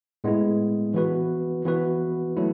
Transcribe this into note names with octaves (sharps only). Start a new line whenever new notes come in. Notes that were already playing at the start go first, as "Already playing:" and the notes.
A2 G#3 B3 E4 G#4
E3 B3 F#4 B4
E3 B3 F#4 B4
F#3 A3 E4